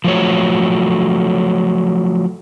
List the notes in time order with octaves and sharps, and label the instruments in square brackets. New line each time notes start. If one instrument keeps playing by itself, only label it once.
[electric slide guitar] F3 F#3 A3 C#5